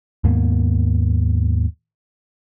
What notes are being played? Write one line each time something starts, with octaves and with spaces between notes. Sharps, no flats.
D#2 G#2 A#3 B3